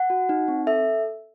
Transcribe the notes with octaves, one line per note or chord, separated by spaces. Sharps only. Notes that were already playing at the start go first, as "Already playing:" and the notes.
Already playing: F#5
F#4
D#4
C4
A4 E5